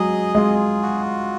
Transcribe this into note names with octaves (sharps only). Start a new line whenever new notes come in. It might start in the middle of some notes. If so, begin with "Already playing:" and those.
Already playing: F#3 G#3 G#4 D#5
G#3 F4
F#4